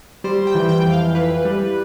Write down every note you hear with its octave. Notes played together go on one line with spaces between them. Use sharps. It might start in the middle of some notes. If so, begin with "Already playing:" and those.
G3 C5
G5
E3
G5
F2
F5
E3 B4
G3